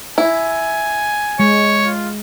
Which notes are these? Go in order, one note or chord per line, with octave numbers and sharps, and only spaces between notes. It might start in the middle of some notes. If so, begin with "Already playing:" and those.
E4 G#5
G#3 C#5
F4